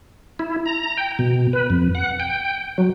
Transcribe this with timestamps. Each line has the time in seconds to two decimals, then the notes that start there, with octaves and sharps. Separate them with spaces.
0.39 E4
0.66 A#5
0.97 G5
1.19 B2
1.53 B4
1.70 F2
1.95 F#5
2.20 G5
2.78 F#3